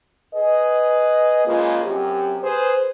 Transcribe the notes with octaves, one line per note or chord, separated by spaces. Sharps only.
G#4 B4 D#5
C#3 F3 G#3 A#3 F4
F#2 C3 G4
G#4 B4 C5